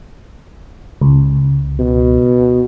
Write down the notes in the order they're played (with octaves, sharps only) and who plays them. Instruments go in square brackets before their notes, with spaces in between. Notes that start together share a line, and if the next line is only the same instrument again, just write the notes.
[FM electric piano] C#2
[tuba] B2